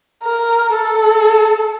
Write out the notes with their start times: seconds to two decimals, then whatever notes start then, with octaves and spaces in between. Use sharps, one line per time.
0.23 A#4
0.73 A4